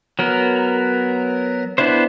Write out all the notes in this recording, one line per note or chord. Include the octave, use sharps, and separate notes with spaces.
F#3 B3 A#4
B3 D4 E4 C5